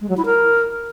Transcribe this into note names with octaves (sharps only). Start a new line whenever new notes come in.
G#3
F#3
E4
A#4